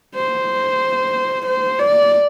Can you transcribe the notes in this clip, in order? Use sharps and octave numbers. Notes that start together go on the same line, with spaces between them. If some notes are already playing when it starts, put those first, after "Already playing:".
C5
C5
D5